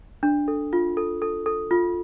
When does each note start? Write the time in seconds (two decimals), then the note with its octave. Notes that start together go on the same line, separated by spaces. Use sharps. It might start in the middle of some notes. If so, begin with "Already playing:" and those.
0.23 D4
0.48 A4
0.73 F4
0.97 A4
1.22 A4
1.46 A4
1.71 F4